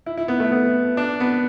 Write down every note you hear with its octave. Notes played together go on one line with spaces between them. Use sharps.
E4
E4
B3
A3
B3
D4
B3